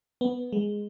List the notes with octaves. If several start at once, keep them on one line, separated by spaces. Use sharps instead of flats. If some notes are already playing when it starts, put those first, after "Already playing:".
B3
G#3